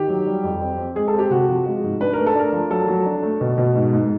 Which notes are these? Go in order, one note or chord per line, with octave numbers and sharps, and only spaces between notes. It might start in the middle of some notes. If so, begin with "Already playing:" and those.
Already playing: D#3 G4
F#3
G3
F2
C4
C4
G#3 G#4
A4
C4
G4
C3 F#4
F3
G#3
G#2
D4 B4
A3 A#4
A4
D4 A#4
F3
F#3 A4
F#3
D4
A3
B2
B2
G#2
G#2